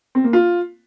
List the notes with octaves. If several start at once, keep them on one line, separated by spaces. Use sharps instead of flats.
C4
A#3
F4